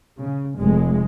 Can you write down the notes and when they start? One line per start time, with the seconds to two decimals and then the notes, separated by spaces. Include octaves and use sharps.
0.20 C#3
0.58 F1 G#3